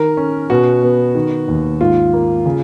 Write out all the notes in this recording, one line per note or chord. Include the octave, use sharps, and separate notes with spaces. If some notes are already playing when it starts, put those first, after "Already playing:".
Already playing: D#3 A#4
C#4
B2 F#4
B3
D#3
D#2
G#2 F4
A#3
C#3